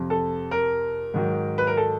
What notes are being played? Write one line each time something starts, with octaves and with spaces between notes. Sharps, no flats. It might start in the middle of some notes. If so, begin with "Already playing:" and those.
Already playing: F2 C3 F3
A4
A#4
G#2 D#3 F#3
B4
A#4
A4